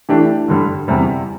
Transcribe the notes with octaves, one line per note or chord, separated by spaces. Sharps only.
E3 A3 D4 G4
G2 D3 G3
E2 C3 G3